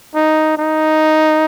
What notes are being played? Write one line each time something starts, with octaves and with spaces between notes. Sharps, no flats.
D#4
D#4